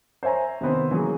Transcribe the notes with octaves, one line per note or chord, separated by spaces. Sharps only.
C5 C#5 E5 G#5 A#5
C3 D#3 B3 C4
E3 F#3 A#3 C#4 G#4